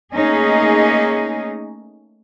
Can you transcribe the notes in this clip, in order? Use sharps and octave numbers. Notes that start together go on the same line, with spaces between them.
A3 A#3 C#4 D#4 G#4 D#5